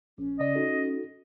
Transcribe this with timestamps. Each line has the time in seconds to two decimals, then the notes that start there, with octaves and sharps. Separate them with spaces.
0.18 A#1 C#4
0.39 G#1 C#3 D5 D#5
0.55 D#4 F#4 A4